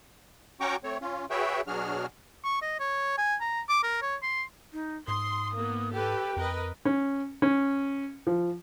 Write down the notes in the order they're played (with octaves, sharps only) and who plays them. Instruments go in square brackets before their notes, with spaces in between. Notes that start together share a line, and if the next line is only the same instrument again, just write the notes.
[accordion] C#4 F#4 G5 A#5 C#6 D6
A3 C4 C#5
C#4 F4
F#4 G#4 B4 C#5 E5 G5
B2 F#3 D4 F#4 G#4 F6
[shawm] C#6
D#5
C#5
G#5
A#5
D6
A#4
C#5
C6
[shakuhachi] D#4
[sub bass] G#2 [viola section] C6 [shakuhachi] D#6
[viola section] A#3 B3
[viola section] G4 A4 B4 [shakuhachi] G5
[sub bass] F2 [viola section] A#4 B4 D#5
[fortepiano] C#4
C#4
F3